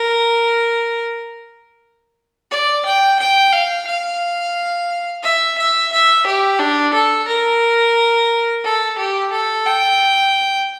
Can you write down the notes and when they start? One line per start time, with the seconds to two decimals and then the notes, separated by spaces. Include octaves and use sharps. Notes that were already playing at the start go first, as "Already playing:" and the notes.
Already playing: A#4
2.51 D5
2.85 G5
3.20 G5
3.53 F5
3.87 F5
5.23 E5
5.58 E5
5.92 E5
6.26 G4
6.59 D4
6.94 A4
7.28 A#4
8.64 A4
8.98 G4
9.32 A4
9.66 G5